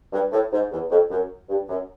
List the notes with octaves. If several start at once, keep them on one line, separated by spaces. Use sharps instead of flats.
G2
A2
G#2
E2
F2
F#2
G2
F#2